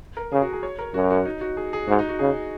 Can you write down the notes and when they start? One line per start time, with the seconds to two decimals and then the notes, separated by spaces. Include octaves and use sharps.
0.17 A#4
0.32 C#3 G#4
0.42 F#4
0.53 G#4
0.63 C#5
0.79 A#4
0.94 F#2 F#4
1.10 F#4
1.25 D#4
1.41 F#4
1.57 G#4
1.73 G#4
1.88 G#2 F#4
1.99 D#4
2.09 F#4
2.19 C#3 G#4